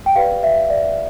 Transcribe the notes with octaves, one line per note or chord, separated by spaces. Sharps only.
G5
G4 B4 D5 F5
E5
D5